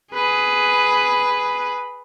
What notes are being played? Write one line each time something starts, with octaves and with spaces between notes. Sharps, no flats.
G#4 B4